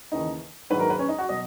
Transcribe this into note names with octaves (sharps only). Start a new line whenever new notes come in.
D#2 C#3 E3 D#4
A#1 G#2 D#3 F#3 B4
A#4
B4
C#4
D#4
F#4
B2 F#3 D#5